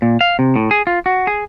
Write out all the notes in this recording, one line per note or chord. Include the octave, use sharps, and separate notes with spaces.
A#2
F5
C3
A2
G#4
F4
F#4
G#4